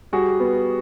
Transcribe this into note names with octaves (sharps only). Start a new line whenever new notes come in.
G3 F#4 G#4
B3